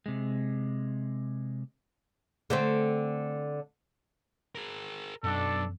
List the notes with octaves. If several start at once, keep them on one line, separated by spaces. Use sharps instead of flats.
C3 G#3
D3 A3 C4
G#4 A#4
F#2 B2 F#3 D4 A4